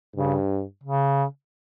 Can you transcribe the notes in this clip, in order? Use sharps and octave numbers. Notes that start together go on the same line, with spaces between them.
G2 C#3
C#3